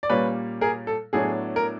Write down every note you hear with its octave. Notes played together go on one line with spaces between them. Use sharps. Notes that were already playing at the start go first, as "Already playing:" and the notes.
D5
A#2 G3 A#3 C#4 B4 C#5
G#4 A#4
A4
A2 F#3 B3 D4 G#4
A#4